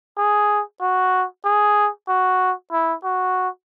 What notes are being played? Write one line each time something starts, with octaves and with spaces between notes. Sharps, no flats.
G#4
F#4
G#4
F#4
E4
F#4